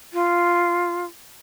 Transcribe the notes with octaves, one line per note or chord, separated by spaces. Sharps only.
F4